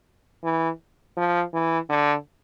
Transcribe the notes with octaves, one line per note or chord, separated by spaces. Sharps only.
E3
F3
E3
D3